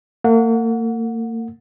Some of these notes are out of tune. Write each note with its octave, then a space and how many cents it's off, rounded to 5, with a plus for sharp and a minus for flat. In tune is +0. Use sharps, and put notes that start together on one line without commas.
A#3 -40 F#5 -25